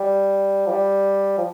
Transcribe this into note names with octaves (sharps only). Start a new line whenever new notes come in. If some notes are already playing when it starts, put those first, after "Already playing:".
Already playing: G3
F3
G3
F3